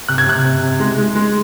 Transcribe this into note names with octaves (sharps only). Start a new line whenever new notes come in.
C3 F#6
G#6
C3 F#6
C3
C3
G#3
G#3
G#3